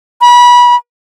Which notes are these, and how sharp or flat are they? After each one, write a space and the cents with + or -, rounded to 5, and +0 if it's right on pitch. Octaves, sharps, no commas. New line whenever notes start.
B5 -25